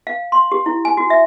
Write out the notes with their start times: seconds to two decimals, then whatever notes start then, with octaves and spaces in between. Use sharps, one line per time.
0.07 F5
0.32 C6
0.52 G4
0.66 E4
0.85 G#5
0.97 F#4
1.10 E5